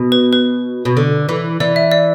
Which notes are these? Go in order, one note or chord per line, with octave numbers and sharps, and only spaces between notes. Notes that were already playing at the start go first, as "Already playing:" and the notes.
Already playing: B2
B4
B4
B2
D3
E3
E3 D5
E5
D5